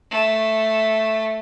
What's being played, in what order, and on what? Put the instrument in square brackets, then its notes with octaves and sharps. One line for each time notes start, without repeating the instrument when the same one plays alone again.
[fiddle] A3